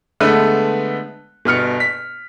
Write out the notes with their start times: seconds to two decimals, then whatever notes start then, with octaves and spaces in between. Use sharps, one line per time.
0.20 D3 G#3 A3 B3 B4
1.45 G1 B2 F6 C#7
1.80 B6